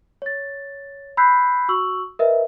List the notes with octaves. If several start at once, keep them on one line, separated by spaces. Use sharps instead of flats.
C#5 A6
B5 E6 F#6 G6 B6 C7
F#4 C#6 E6 F#7
A#4 B4 D#5 E5